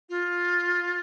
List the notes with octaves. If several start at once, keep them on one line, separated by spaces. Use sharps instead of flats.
F4